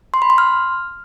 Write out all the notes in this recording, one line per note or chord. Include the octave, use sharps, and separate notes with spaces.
C6
B5
C6
F6